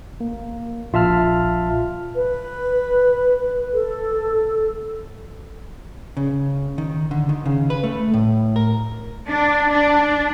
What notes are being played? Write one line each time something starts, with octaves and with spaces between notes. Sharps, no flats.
A#3
A#1 F4 E5 A5 F6
B4
A4
C#3
D#3
D3
D#3
C#3
B4
A3
A2
A#4
D4
D4